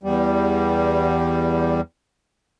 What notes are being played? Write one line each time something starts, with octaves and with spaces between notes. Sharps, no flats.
E2 G3